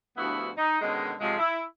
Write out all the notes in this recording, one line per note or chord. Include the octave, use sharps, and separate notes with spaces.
D2 G2 F3 B3 E4 F#4
D#4
B2 D3 D#3 G#3 C#4 D#5
C3 F3 F#3 G#3
E4